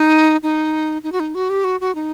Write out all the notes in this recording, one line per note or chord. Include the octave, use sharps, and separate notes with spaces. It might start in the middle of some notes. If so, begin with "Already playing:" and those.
Already playing: D#4
D#4
D#4
F#4
D#4
F#4
G4
F#4
F#4
D#4